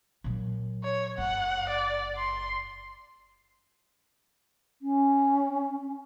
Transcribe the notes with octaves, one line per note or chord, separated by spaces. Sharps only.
A#2 F#3
C#5
F#1 F#5
D5
C6
C#4